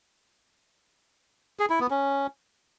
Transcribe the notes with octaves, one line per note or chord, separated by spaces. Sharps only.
G#4
E4
B3
C#4